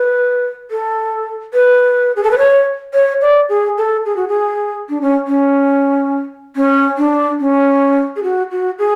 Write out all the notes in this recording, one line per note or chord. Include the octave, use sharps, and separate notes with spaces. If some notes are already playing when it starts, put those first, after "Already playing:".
Already playing: B4
A4
B4
G#4
A4
B4
C#5
C#5
D5
G#4
A4
G#4
F#4
G#4
D4
C#4
C#4
C#4
D4
C#4
G#4
F#4
F#4
G#4